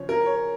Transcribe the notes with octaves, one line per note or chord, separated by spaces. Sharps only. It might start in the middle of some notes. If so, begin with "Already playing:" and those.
Already playing: C#3 F3 C#5
A#4
C#5